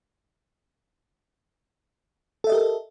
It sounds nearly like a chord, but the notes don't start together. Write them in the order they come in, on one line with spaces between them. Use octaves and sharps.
A4 E5 D#5 G4 A#4